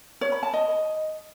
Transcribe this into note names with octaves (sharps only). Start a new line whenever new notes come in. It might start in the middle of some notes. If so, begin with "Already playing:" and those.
C#5
B5
A5
D#5